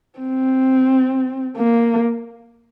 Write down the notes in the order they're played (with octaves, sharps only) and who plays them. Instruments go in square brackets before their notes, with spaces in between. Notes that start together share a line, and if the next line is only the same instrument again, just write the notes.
[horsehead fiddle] C4
A#3